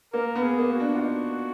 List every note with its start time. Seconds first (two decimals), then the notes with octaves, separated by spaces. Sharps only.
0.13 A#3 A#4
0.35 B3
0.43 G#4
0.58 A#3
0.72 F#4
0.80 D4
0.95 F4
1.02 D#4 F#4